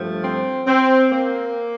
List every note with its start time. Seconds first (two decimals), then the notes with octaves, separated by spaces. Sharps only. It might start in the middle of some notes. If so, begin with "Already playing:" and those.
Already playing: G2 F3 A3
0.23 C4
0.67 C4
1.10 A#3